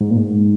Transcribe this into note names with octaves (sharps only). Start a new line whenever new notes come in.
G#2
A#2
G#2